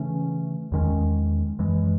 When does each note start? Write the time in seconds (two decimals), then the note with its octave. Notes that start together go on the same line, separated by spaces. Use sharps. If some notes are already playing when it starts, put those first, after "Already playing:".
Already playing: C#3 E3 A3 C#4
0.72 E2 D#3 G#3 C#4
1.59 F#2 E3 G#3